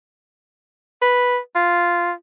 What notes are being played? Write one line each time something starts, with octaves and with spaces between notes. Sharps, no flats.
B4
F4